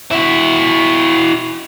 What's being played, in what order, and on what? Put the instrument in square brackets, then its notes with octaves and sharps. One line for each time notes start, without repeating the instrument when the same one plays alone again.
[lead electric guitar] E4 F#4